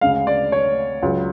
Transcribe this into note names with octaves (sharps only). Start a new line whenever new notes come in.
D2 C#3 G#3 F5
D5
C#5
C#2 C#3 F#3